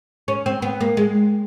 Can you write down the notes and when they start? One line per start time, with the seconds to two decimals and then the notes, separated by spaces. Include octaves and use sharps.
0.28 C#4
0.46 C4
0.62 B3
0.81 A#3
0.97 G#3